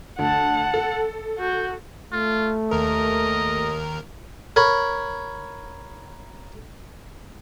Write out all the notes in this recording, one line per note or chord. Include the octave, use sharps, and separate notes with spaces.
D2 F#5 A5
A4
F#4 G6
A3 F4
D#2 A#4 D#5
A#4 C#5 B5